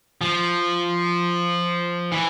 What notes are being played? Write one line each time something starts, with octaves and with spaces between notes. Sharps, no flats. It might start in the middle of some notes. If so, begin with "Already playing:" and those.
F3
E3